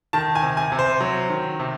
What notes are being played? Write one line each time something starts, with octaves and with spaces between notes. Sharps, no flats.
D#3 A5
G#5
C3
G#5
C3
C5
F#3
D#3
C3